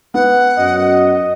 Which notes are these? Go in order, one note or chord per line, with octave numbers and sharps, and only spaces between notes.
B3 F#5
F#2 D#5